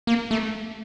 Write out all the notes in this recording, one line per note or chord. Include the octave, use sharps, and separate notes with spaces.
A#3
A3